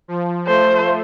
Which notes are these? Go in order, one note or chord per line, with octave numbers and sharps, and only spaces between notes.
F3
A3 C5